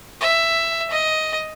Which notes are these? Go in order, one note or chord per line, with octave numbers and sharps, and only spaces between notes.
E5
D#5